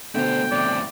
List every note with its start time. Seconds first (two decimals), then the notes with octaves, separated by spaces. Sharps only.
0.15 B2 D3 A3 C5 G5
0.52 F2 A2 D5